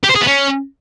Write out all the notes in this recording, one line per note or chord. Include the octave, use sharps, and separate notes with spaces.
G4
C5
G#4
B3
C#4